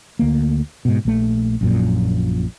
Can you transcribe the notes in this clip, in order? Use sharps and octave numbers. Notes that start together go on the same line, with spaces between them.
D2 A#3
G#2 B2
A#1 A3
A#1 F#2 A#2